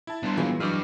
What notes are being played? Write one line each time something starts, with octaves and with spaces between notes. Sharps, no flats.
E4 A5
G3 B3 D4 C6
A#2 E3 F#3 G#3 F5
F#3 D4 F#4 B4 D#5 C#6 D6 F6